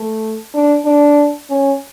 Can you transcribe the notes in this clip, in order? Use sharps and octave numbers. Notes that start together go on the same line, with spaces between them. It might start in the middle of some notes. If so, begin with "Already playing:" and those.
Already playing: A3
D4
D4
C#4